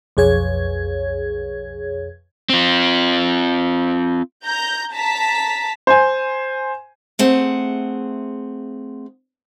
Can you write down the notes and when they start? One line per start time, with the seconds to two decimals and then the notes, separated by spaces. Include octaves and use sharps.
0.17 B1 F2 G#4 C#5 G#6
2.49 C4 F4
4.45 A#5 G6
4.94 A5 A#5 B6
5.87 C5 G#5
7.19 A3 C4 G#4 F#5